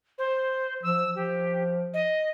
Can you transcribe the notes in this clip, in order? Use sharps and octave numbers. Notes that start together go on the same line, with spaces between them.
C5
F3 E6
F3 G4
D#5